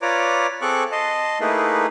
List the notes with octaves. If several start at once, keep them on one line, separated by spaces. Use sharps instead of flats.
F4 B4 C#5 D5 A#5 D6
C4 G#4 A4 C#6 D6 F#6
D#5 A5 C6
A3 A#3 D#4 E4 G#4 B4